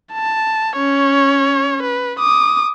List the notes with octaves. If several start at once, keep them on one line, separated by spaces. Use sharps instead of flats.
A5
C#4 C#5
B4
D6 D#6